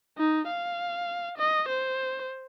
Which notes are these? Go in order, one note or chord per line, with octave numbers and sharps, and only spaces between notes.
D#4
F5
D#5
C5